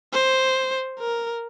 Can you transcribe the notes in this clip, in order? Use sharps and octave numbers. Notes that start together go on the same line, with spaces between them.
C5
A#4